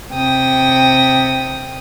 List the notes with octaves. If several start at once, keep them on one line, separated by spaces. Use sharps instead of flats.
C3 G5 D#6